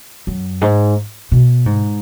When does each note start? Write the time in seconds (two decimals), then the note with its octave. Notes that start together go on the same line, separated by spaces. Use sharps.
0.27 F#2
0.61 G#2
1.32 B2
1.66 G#2